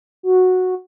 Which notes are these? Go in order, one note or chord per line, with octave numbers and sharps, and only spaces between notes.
F#4